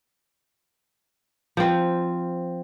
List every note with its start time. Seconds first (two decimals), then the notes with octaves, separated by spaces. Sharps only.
1.57 F3 C4